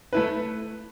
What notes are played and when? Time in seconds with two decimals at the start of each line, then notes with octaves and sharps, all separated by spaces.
0.13 A3 E4 B4